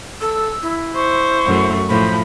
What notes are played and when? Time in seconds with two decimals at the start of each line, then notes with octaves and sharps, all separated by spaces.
0.21 A4 E6
0.62 E4
0.95 C5 C#6
1.46 F#2 A3
1.90 A2 F3 C5 B5